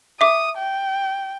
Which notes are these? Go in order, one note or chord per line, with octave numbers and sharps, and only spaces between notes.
E5 D6 D#6
G5